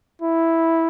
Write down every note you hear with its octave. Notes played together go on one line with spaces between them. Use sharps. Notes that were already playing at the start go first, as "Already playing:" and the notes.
E4